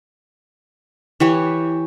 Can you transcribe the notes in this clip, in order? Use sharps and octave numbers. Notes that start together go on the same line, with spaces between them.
E3 G4 C#5